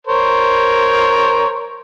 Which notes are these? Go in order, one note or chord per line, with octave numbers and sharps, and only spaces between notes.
A#4 C5 C#5